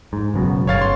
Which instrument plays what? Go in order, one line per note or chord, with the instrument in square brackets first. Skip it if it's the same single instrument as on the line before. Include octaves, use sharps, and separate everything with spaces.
[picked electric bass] G#2
F#1 F#2 B2
[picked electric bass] G1 [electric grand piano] C#5 F5 A6
[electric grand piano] C6